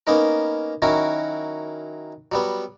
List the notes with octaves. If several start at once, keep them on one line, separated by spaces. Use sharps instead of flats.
A#3 B3 C#4 D#4 A#4
D#3 F#3 C#4 E4 F#4 A#4
F#3 G3 B3